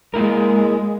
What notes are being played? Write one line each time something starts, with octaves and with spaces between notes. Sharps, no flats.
G#3 A#3 E4 A#4